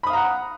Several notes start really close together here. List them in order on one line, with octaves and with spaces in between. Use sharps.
B5 D#6 F5 A#5 F#5